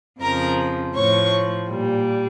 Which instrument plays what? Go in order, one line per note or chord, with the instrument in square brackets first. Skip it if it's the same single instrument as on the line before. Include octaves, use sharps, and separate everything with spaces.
[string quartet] F2 C#3 F3 A#4 A#5
A2 F3 C#5 C#6
A#2 G3